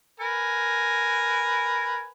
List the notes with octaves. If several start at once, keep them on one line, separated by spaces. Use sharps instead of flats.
A#4 B4 G#5